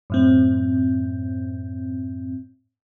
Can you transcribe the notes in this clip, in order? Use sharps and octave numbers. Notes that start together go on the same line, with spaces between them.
F#2 A2 C4